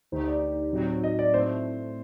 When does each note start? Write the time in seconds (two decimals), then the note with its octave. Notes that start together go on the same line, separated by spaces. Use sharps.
0.12 D2 D3 A3 D#4 G4 C5
0.27 D5
0.73 A2 F#3 C4 D#4 F#4
1.04 D#5
1.19 D5
1.34 A2 A3 C4 C5